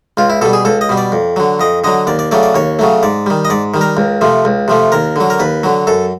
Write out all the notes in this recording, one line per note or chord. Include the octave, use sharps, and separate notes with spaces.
C#2 F4
E4
B2 G3 A4
G#4
C#2 A4
D#5
B2 G3
D5
F2
D3 F#3
F2 D#5
D3 F#3 D#5
D#2 D5
D5
C#3 F#3 A3 D5
D5
D#2 C#5
C#3 F#3 A3
G#2 D5
D#3 G3
D#5
G#2 D5
D#3 G3
A#4
C#2
C3 F3 A3
C#2
C3 F3 A3
D#2 A#4
D3 F#3
A#4
D#2 B4
D3 F#3
F#2 A4